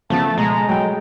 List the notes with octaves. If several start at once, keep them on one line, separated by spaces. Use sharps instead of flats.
C#3 F3 A3 B3 A5
B2 G#3 A#5
F#3 A3 B3 G5